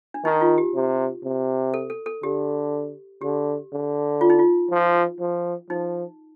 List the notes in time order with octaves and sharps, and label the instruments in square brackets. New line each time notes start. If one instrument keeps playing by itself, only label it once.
[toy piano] D4
[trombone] D#3 [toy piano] D#4
[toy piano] F4
G4
[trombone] C3
C3
[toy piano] A4
A4
A4
[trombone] D3 [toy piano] G4
[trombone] D3 [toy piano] G4
[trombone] D3
[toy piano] F4
D#4
F4
[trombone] F3
F3
[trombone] F3 [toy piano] D#4